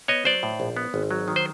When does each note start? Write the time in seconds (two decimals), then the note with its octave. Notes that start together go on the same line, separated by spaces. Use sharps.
0.08 B3 C#5 D#5
0.25 F#3 C5 D5
0.43 A2
0.60 A#1
0.77 B3
0.94 G#1
1.11 F#3
1.28 D#3
1.36 C5